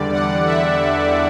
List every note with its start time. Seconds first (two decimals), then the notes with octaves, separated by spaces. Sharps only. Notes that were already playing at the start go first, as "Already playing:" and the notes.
Already playing: E2 D3 G3 D5
0.13 F#5
0.47 E5